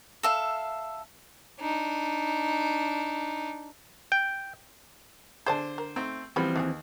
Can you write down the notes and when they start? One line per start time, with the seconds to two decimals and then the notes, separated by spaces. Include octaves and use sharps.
0.23 A4 E5 F5
1.61 D4 D#4
4.12 G5
5.46 D3 G#4 C5 D5 A5
5.78 A#4
5.96 A3 C4 D#4
6.36 C#3 E3 F3 G3 B3 C4 B5
6.56 D#2 B3 G4 G#4